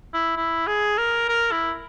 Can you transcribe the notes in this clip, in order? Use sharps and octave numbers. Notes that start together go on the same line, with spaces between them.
E4
E4
G#4
A#4
A#4
E4